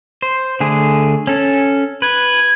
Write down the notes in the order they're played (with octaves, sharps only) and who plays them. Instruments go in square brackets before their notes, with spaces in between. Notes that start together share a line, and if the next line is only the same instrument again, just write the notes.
[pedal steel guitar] C5
D3 A3 G#4
C#4 A4
[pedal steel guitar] B4 [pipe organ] G#6